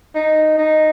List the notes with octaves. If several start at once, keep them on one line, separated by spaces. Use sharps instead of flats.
D#4
D#4